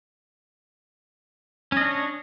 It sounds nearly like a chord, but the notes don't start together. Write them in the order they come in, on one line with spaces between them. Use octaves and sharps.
C#4 D#5 D4 C#5